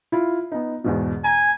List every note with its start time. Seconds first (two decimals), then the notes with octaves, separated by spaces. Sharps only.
0.12 E4 F4
0.52 B3 D#4
0.84 E2 G#2 B2
1.24 G#5 A#5